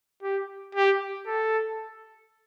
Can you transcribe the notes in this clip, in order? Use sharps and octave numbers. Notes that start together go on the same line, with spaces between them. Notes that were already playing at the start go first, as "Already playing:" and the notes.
G4
G4
A4